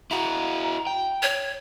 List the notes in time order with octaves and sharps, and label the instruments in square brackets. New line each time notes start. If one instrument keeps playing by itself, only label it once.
[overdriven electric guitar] E4 F#4 [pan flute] A#5
[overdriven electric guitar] G5
[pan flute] C#5